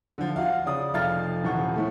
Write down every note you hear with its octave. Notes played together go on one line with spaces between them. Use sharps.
D3 F3
F4 F#4 F5
C#3 D5 D#6
F1 F3 F5 F6 A6
D#1 E3 F3 F#5 C#6
A2 A3